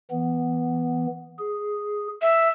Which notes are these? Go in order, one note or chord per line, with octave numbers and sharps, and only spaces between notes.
E3 B3
G#4
E5